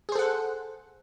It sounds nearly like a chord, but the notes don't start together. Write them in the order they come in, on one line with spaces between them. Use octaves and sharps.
G#4 C5 A4 F#5